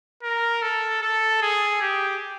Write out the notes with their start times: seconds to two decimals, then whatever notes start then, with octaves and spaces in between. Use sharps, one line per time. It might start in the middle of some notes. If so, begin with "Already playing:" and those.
0.23 A#4
0.62 A4
1.02 A4
1.42 G#4
1.82 G4